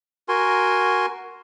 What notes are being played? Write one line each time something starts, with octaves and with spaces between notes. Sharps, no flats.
F#4 A#4 G#5 C6